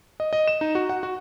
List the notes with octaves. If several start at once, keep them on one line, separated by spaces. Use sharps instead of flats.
D#5
D#5
E7
D#4
F#4
F#5
F#4